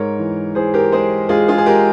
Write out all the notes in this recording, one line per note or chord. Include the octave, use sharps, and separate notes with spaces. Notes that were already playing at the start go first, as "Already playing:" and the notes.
Already playing: G#2 A#4 C#5
E3
E3 G#4 C5
G4 A#4
G#3 G#4 C5
G#3 F4 G#4
F4 G#4
G#4
G#3 G4 A#4